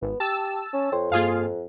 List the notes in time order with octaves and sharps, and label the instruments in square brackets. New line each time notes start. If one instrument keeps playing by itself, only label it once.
[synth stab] G#1 [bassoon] B3
[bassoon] G4 [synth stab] A5 E6
[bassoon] C#4
[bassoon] F2 [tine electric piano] C#5 G5 C6
[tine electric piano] G2 A#3 [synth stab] F4 G#4 F5